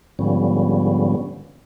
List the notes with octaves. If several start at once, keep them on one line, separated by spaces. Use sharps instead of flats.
G#2 D3 F3 G3 B3 C#4